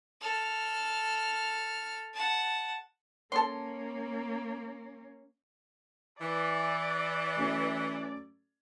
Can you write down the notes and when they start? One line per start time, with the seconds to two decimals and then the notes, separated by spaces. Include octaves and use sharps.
0.22 A4 F6
2.14 F#5 A5
3.32 A#3 C#4 A4 C6
6.20 E3 D5
7.36 F#3 A3 C#4